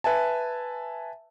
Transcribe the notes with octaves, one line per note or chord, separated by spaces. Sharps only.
B4 E5 G#5 A5